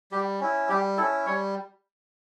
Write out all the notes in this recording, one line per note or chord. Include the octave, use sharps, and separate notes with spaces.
G3 G4
C#4 E4
G3 G4
C#4 E4 A4
G3 C#5